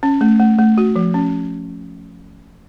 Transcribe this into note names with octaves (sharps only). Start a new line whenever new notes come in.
C#4
A3
A3
A3
F#4
F3
C#4